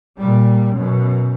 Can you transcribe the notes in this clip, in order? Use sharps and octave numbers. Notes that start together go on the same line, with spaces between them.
A#2 G3
F#2 B2